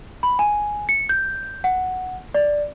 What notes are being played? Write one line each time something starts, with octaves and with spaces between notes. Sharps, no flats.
B5
G#5
C#7
G6
F#5
D5